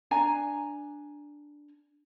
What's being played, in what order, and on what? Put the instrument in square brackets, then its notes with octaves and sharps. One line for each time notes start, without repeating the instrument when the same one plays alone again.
[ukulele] D4 G#5 A#5